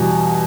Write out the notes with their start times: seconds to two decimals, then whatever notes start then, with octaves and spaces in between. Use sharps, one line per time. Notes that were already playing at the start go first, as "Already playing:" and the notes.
Already playing: E2 B2 G3